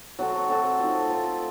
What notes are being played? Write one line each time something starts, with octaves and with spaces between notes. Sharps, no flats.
F#3 C4 F#4 A4
A3 C4 F#4 A4
F3 C4 D#4
A3 C4 F4